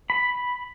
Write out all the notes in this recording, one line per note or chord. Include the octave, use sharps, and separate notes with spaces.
B5